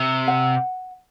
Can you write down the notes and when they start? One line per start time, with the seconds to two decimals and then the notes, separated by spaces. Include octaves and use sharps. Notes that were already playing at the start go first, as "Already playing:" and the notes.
Already playing: C3
0.28 F#5